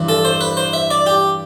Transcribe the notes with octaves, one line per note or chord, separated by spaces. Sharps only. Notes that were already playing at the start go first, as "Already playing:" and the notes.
Already playing: G2 E3
A4
C5
B4
C5
E5
D5
G4